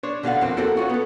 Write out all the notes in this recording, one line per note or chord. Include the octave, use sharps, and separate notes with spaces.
D4 C5 C#5
B2 D3 F5 F#5
F2 F3 A#3 C4
A#3 C4 F#4 G4 A4 A#4
C#4 F4 F#4
B3 A4